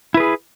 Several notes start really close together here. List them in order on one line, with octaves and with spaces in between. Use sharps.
E4 B4 G#4